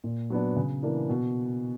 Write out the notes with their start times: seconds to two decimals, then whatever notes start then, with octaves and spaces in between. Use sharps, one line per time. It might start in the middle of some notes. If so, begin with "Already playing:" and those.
0.04 A#2
0.30 F#3 B3 D4
0.56 C#3
0.83 E3 A#3 D4
1.09 B2